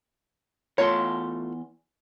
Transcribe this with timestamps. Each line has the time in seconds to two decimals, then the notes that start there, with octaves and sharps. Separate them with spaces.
0.78 E2 A3 F4 C#5 C6